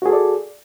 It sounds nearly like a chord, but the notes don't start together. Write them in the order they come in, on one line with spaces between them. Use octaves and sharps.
F#4 G#4 A4 D5